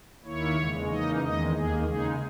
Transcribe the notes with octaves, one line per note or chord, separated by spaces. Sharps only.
D#2 D#3 A#3 E4 C#5
E2 C#3 G#3
C#3 E3 A#3 D#4 D#5
E2 D#3 G#3 D#5
D#2 D#3 A#3 G#4
C#3 G#3 D#4 G#4